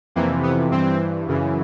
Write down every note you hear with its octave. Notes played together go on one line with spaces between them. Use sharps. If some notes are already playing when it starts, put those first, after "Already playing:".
F2 C3 E3 A#3
B3
G2 E3 C4
F#2 C#3 E3